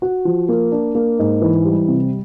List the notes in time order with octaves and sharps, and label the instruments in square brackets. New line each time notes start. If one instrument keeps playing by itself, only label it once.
[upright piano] F#4
F3
A#3
D4
A#3
G#2
E3
G3
C3